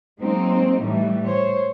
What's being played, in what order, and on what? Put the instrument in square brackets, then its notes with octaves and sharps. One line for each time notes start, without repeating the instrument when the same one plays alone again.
[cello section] F#3 G#3 A#3 C4 D#4
A2 E3 G3 A3
C5 C#5